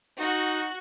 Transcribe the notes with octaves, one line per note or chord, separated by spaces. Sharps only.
D#4 F#4